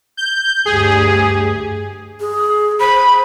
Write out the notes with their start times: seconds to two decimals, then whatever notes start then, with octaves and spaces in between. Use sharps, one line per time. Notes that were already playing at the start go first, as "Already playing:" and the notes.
0.17 G6
0.66 D2 G2 G4 G#4
2.20 G#4
2.80 C5 B5